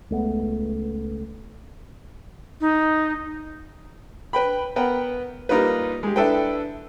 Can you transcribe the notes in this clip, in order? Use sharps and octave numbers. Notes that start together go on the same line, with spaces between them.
C#2 A3 B3
D#4
B4 G5 B5
B3 A#4 B4 F#5 G5
G3 A#3 D#4 F4 B4
G#3 G4
D4 E4 A4 B4 G5